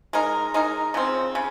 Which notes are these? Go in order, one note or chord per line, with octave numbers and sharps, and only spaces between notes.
G#3 D#4 A#4
G#3 D#4 A#4
C#3 F3 C4
C#3